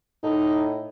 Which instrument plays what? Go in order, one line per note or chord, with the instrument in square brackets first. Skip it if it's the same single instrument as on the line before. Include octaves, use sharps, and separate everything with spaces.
[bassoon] A2 [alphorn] D#4